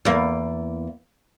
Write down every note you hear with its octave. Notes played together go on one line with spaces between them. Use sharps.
E2 A#3